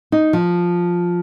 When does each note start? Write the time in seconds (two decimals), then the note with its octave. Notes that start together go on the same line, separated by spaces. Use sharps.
0.12 D#4
0.33 F3